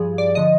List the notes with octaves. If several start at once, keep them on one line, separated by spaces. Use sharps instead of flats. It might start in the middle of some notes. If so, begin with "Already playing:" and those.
Already playing: G2 F3 G#4
D5
D3 F3 D#5